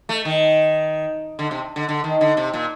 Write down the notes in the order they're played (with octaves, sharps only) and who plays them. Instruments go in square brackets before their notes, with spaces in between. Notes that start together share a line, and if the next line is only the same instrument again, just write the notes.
[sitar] A3
D#3
D3
C3
D3
D3
D#3
D3
C3
A#2